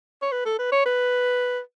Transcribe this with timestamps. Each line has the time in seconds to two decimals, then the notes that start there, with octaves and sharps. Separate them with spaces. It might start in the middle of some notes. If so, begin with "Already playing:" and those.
0.22 C#5
0.32 B4
0.45 A4
0.59 B4
0.72 C#5
0.85 B4